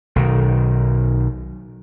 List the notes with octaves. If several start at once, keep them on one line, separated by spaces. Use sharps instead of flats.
B1 D#3